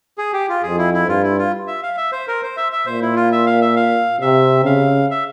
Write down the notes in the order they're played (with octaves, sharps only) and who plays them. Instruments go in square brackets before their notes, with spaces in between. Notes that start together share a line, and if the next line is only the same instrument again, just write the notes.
[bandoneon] G#4
G4
F4
[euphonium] F2 [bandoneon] G#4
[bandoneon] E4
E4
[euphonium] G2 [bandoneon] F4
[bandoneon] E4
F4
E5
F5
E5
C5
A#4
C5
E5
E5
[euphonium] A#2 [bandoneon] C5
[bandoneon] E4
F4
E5
F5
E5
F5
[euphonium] C3 [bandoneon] E5
[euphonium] C#3 [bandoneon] F5
[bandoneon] E5